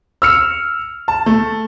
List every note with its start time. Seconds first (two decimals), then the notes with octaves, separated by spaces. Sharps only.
0.22 E6 F6 C#7
1.08 A5
1.26 A3